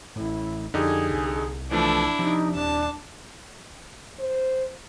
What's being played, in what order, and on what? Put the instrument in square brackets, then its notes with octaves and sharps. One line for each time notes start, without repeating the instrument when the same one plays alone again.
[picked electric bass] A1 A2 [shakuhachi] E4
[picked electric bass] F2 [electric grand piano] D3 D#4 G4 [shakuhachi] G#4
[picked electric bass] C2
[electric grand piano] E3 F3 A3 [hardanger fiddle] D4 E4 [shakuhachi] A5
[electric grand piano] C3 [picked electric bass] F3 [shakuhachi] D#4
[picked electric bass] D#1 [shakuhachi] D4 [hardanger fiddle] A5
[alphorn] C5